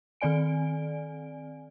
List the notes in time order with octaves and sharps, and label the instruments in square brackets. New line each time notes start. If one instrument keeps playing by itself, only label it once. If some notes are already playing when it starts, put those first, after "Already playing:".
[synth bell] D#3 C4 D5 G#5 D7